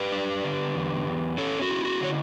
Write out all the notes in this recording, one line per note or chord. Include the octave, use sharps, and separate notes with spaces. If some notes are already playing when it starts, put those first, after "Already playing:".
Already playing: G4 B4
D4
D3
E2
E2
C#4 A4 C#5
F#4
E4
F#4
D3 C#5